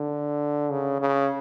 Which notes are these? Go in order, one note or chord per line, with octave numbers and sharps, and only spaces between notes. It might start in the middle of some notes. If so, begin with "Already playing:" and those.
Already playing: D3
C#3
C#3